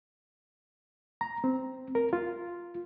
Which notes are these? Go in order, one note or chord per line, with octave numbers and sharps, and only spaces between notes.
A#5
C4
A#4
F4